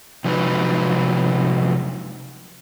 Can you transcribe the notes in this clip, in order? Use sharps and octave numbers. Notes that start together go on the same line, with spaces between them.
C3 F3 F#3 G#3 D#4 B4